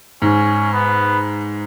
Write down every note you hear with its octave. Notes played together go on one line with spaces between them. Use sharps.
G#2 C#4
B3